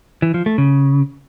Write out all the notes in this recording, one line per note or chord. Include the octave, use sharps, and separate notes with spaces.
E3
F3
A3
C#3